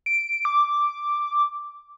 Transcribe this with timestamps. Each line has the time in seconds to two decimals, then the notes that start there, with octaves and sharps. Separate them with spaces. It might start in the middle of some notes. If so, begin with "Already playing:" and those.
0.06 D7
0.45 D6